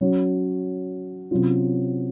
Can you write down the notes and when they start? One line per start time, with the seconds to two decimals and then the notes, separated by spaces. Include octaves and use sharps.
0.01 F#3 C#4 F#4
1.31 C3 F#3 C#4 F4